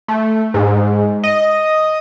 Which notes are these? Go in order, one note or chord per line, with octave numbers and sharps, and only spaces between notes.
A3
G#2
D#5